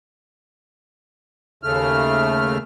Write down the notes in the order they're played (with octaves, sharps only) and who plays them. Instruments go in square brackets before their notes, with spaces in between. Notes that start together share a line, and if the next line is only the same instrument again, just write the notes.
[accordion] D#2 C#3 A3 F6